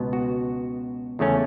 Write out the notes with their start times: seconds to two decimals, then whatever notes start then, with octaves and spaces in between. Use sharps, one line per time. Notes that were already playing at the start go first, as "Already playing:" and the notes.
Already playing: C#2 B2 B3
0.13 F#4
1.19 E2 C#3 A3 C#4